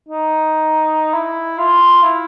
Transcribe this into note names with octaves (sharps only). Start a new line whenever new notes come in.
D#4
E4
F4
E4